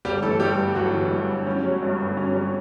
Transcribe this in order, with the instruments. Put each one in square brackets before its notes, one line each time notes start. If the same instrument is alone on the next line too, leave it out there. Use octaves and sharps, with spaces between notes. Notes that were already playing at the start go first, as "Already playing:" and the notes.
[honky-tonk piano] G1 [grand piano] G3 G4
[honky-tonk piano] E3 [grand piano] A3 A4
[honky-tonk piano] G2 [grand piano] G3 G4
[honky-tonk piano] G1
[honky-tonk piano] G1 [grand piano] F#3 F#4
[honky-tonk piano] E3
G2
G1
C#4
F#3
G2
G1
C#4
F#3